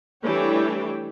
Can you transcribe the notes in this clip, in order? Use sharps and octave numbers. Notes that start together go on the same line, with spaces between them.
E3 G3 A3 D4 C#5 G5